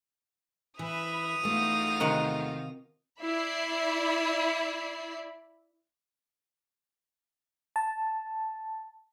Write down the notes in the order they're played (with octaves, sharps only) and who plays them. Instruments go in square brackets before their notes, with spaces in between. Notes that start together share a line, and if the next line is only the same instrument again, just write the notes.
[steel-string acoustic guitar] E3 [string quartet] B4 E5 B5 [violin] D#6 F7
[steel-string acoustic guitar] E2 A3 [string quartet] D#4 F4 F#4
[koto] C3 D#3 F#5
[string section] E4 D5 E5 B5 C7
[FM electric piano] A5